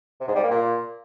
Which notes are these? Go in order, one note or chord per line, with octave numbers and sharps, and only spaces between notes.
C3
G#2
G3
A#3
A#2